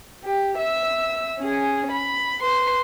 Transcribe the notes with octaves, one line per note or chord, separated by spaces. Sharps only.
G4
E5 E6
C#4 G#4
B5
B4 C6